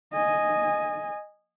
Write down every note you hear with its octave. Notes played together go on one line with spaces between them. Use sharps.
D#5 G#5